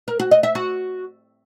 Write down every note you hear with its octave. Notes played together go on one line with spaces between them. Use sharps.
A#4
F#4
D#5
E5
F#4